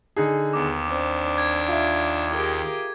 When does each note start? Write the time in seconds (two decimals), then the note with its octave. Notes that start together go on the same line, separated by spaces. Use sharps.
0.16 D3 D#4 G#4
0.53 D#2 B3 D6
0.90 C4 D4
1.38 G#6
1.68 F4 E5
2.32 G4 G#4 A#4